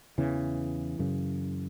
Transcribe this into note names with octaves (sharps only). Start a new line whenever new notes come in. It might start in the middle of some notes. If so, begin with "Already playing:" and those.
E2 C#3 E3
F#2 C#3